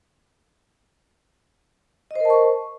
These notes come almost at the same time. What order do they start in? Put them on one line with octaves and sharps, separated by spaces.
D#5 C5 A#4 A5 C#6